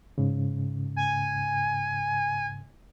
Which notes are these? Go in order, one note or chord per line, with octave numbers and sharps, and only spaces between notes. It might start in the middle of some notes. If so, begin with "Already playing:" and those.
G#2 C#3
G#5